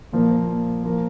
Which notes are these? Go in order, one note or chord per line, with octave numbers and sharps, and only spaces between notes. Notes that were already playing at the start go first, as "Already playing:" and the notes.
A#2 F3 A#3
F3 A#3